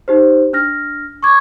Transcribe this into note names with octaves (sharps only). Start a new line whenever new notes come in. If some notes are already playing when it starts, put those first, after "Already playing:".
D#4 G4 C5
D4 F6 A#6
C#6 D6 G#6